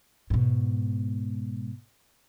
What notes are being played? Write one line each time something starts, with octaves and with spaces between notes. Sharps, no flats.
G#2 B2